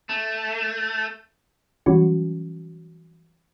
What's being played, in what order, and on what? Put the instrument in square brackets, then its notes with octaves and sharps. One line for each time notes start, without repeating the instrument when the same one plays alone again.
[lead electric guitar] A3
[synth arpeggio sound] E3 F#3 G3 C#4 F#4